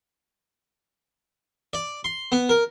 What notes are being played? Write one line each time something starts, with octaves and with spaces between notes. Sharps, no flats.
D5
C6
B3
A#4